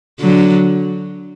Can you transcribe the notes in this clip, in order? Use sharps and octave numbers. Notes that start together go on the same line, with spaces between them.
D3 F#3